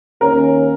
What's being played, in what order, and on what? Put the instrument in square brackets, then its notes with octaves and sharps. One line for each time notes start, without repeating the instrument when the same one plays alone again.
[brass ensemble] D#2 D#3 A#3 C#4 [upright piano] A#4